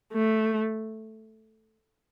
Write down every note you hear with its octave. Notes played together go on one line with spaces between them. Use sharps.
A3